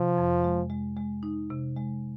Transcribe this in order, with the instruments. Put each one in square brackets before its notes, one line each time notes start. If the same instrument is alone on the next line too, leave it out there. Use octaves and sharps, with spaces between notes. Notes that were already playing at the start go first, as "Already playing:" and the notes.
Already playing: [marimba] C3 [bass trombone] F3
[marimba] F2
G#3
G#3
G#3
D#4
C3
G#3